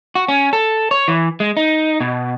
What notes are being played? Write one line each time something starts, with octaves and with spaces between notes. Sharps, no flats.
F#4
C#4
A4
C#5
E3
G#3
D#4
B2